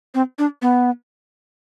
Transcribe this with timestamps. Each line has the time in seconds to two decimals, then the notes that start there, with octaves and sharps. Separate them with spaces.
0.15 C4
0.39 D4
0.62 B3